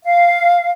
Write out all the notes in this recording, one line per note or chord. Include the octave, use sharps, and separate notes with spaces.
F5